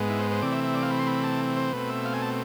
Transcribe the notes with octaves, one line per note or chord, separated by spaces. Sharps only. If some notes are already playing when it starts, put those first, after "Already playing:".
Already playing: G#2 G#3 B3
E4
C5
C5
C3 E3 A3 C4 D5
E5
E5
D5
F5
B5
C6
B5
A5
C5
B2 A3 C4 B4
E5
F5
G#5
A5